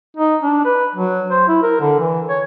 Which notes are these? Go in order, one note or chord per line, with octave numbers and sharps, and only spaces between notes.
D#4
D4
B4
F#3
C5
E4
A#4
D3
E3
C#5